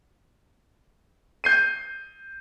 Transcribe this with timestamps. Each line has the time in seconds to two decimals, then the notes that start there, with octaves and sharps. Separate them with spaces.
1.44 G6 C7 D#7